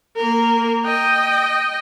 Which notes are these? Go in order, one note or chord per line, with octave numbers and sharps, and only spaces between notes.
A#3 A#4
D#5 G5